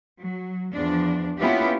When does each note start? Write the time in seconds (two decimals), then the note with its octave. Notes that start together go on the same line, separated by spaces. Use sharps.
0.20 F#3
0.73 E2 F3 D4
1.38 A#3 B3 C#4 E4 F4 G4